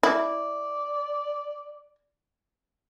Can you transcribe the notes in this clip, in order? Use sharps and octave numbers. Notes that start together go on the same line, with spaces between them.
E4 D5